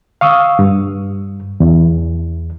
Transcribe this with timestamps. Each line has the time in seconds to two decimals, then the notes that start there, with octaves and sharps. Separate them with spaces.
0.21 F5 C#6 D#6 E6
0.59 G2
1.60 E2